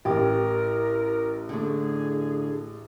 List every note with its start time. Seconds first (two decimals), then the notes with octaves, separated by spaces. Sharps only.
0.05 A1 G4 A#4
1.49 D3 A3 G#4